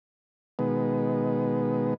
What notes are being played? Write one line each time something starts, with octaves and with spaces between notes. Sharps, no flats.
B2 D#3 G#3 B3